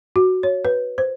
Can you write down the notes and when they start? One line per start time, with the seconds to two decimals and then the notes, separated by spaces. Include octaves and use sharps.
0.16 F#4
0.43 C#5
0.65 B4
0.98 C5